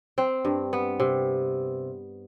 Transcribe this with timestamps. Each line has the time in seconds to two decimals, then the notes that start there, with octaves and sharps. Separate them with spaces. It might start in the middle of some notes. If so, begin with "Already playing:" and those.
0.18 C4
0.45 G2
0.73 B3
1.00 C3